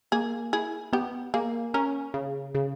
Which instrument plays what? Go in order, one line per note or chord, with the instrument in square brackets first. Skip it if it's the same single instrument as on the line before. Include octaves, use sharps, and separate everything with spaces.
[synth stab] A#3 [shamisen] G#4
[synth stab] E4 [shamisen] G#4
[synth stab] B3 [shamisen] G4
[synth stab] A#3 [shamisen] G#4
[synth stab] C#4 [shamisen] A#4
[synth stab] C#3
C#3